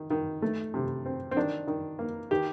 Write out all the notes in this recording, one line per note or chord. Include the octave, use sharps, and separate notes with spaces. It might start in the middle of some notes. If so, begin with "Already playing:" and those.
Already playing: D#3
D#3
A3
C3
C4
C4
D#3 D4
D#3
A#3
D#3 G4